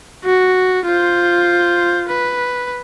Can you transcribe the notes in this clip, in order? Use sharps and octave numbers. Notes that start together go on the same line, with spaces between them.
F#4
F4 C5
B4